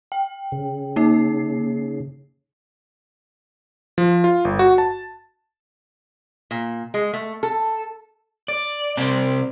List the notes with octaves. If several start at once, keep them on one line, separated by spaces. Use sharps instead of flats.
G5
C#3
A#3 D#4 C7
F3
F4
G1
F#4
A5
A#2
G#3
A3
A4
D5
C3 C4 D5